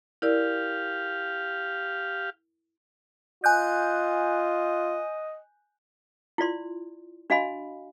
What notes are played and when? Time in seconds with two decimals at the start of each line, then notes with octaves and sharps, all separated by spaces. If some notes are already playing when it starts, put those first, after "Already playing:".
0.22 E4 G4 A#4 D5 F5
3.44 F4 D#5 G#5 F#6 G6
6.38 E4 F4 D5 C6
7.30 D4 F#4 D#5 F5 G#5 B5